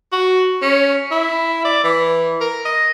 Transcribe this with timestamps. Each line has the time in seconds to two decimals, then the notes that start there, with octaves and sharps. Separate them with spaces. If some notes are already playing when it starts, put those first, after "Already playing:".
0.12 F#4
0.62 C#4
1.11 E4
1.65 D5
1.84 E3
2.40 A#4
2.65 D#5